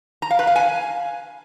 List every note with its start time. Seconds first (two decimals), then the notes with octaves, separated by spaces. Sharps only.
0.22 A#5
0.31 F5
0.39 B4
0.47 F5
0.56 G#5